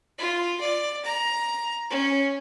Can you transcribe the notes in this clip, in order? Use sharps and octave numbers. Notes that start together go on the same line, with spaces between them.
F4
D5
A#5
C#4